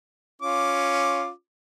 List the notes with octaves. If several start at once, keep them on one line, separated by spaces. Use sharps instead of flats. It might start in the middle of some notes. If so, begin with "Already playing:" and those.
C#4 F4 D6